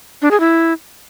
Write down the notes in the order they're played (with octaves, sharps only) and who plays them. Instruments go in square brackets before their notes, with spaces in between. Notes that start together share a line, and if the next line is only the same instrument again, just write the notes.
[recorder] D4
G#4
E4